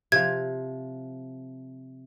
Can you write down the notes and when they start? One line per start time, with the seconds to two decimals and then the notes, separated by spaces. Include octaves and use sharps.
0.12 C3 F3 G#6